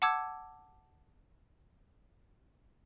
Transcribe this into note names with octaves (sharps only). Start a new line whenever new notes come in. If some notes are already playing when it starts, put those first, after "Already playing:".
F#5 A5 D6 E6 G#6